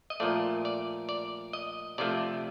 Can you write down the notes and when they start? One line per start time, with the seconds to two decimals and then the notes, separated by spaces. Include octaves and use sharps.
0.10 D#5
0.20 A#2 F3 A3 D5
0.65 D5
1.09 D5
1.53 D#5
1.98 C3 F3 A3 D5